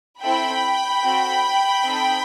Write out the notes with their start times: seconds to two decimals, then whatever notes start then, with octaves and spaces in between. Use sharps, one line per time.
0.22 C4 E4 A4 G5 B5
1.04 C4 F#4 A4
1.84 C4 D#4 A4